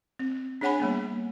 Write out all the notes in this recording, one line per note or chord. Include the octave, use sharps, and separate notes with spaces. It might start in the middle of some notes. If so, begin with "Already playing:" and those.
C4
D4 G#4 C#5 F#5 G#5 B5
G3 A#3 B3